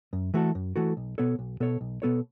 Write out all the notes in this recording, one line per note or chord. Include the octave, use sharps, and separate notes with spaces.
F#2
E3 A3 F#4 A4
F#2
E3 A3 F#4 A4
B1
B2 B3 A4 C#5
B1
B2 B3 A4 C#5
B1
B2 B3 A4 C#5